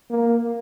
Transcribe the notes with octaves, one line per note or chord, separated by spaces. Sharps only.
A#3